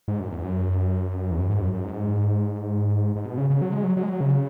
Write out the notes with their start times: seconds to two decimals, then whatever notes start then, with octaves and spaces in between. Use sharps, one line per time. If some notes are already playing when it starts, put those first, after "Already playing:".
0.08 G#2
0.20 F#2
0.31 E2
0.44 F#2
1.31 E2
1.39 F#2
1.49 G#2
1.61 F#2
1.74 F#2
1.84 G#2
3.16 G#2
3.26 B2
3.38 C#3
3.50 C#3
3.62 F#3
3.73 G#3
3.84 F#3
3.97 F#3
4.03 G#3
4.09 F#3
4.20 C#3